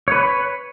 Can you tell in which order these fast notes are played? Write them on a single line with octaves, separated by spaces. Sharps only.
C#5 B4 B5